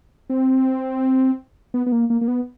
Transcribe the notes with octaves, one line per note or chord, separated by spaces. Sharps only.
C4
B3
B3
A#3
A#3
A#3
B3